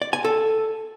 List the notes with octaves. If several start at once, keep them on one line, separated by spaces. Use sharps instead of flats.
D5
G#5
A4